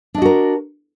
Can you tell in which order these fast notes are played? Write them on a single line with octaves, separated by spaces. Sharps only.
D4 D#5 F#4 A#4